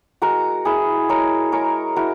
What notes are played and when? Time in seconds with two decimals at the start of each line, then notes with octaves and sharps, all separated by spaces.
0.22 G#3 F#4 A#4
0.65 E4 G#4 B4
1.09 G#3 A#4 C#5
1.52 G#3 A#4 C#5
1.96 E4 F#4 A#4